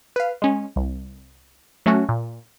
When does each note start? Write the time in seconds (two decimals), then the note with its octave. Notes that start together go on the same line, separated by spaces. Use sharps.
0.16 B4 F5
0.42 G#3 C#4
0.76 C2
1.86 F#3 A3 C#4 F#4
2.09 A#2